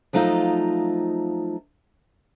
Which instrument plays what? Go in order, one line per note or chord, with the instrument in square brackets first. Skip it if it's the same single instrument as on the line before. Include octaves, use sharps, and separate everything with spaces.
[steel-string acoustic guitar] F3 F#3 A3 D#4 F4 D#5